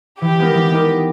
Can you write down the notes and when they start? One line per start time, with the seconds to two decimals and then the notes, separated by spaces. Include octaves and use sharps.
0.21 E3 G4
0.39 G#3 B3 D#4 A#4
0.55 E3
0.71 G#3 B3 D#4 A#4